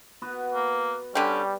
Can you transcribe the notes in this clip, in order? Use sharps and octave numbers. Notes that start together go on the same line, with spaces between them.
B3 F#4 B4
A#3
D3 G3 C#4 G4